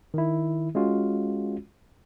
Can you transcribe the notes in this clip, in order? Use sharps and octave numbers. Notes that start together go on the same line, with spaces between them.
D#3 E4
G#3 C#4 F4 F#4